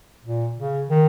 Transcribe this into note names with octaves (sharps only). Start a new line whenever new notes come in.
A#2
C#3
D#3